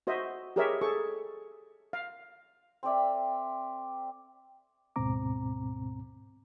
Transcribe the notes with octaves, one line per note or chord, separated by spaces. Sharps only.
F#4 C5 D#5 E5
G4 G#4 A#4 C#5 D#5 E5
G#4 A4 C#6
F5
C4 A4 D5 E5
D2 G#2 B2 C4 A#5 D6